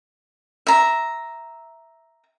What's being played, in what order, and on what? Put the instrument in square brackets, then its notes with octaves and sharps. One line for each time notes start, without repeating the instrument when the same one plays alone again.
[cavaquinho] E5 A#5